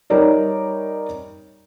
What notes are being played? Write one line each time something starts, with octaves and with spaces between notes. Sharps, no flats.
G3 D#4 A#4 C#5 D5